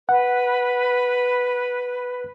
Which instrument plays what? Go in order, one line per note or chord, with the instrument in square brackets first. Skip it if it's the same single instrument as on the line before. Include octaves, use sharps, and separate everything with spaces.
[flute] B4 [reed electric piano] F#5